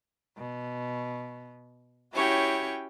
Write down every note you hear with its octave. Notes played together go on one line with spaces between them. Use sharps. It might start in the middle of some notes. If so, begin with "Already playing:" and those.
B2
C#4 E4 F#4 G4 C#5 G5